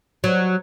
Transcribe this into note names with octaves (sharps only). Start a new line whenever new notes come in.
F#3